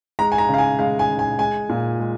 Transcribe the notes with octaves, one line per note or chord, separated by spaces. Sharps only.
G#3 A#5
G#5
A#5
C#3
F5
G#5
G#3 F5
G#5
C#3
G#5
G#3 G#5
A#2
G#3